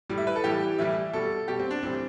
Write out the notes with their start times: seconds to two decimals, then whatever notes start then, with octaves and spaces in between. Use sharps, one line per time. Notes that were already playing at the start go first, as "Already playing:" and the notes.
0.10 A2 G3
0.18 E5
0.27 B4
0.36 A4
0.44 A2 E3 G3 G4
0.78 A2 E3 G3 E5
1.13 B2 G3 A4
1.48 B2 G3 G4
1.59 C4
1.71 D4
1.83 A2 E3 G3 C4